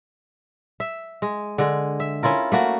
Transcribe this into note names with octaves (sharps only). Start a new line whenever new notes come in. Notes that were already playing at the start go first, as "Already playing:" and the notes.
E5
G#3
D3 G#3
E5
C#4 E4 F4 A#4
A3 A#3 F#4